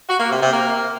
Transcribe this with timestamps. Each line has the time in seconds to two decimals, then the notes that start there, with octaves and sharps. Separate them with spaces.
0.08 F#4
0.19 A#3
0.30 C3
0.40 C3
0.51 A#3